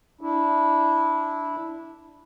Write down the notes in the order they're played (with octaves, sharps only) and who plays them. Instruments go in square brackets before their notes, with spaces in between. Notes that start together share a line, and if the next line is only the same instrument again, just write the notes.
[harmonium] D4 E4